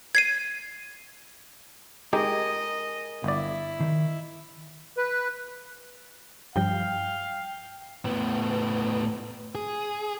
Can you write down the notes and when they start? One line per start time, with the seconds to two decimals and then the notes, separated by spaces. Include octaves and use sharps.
0.15 G#6 C7 D#7
2.13 G#3 D#4 G4 G#4 A#4 D#5
3.24 G1 E4 D5
3.80 D#3
4.97 B4
6.56 G2 F3 G3 F5 G5
8.05 A2 B3
9.55 G#4